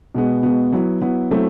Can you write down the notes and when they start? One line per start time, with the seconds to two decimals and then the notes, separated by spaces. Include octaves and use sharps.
0.15 B2 G#3 B3
0.43 B2 G#3 B3
0.72 F#3 B3 E4
1.01 F#3 B3 E4
1.31 F#3 A3 C4 E4